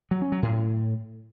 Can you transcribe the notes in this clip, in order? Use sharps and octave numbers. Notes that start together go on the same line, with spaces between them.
F#3
C#4
F#3
A2